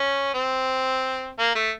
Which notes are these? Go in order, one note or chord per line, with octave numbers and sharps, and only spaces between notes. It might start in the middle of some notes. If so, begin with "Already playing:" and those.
Already playing: C#4
C4
A#3
A3